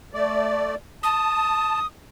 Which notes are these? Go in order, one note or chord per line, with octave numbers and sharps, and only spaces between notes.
A3 D5
A5 D#6